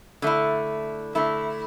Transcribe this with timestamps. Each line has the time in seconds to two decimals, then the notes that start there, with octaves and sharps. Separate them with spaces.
0.22 D3 A3 E4
1.15 D3 A3 E4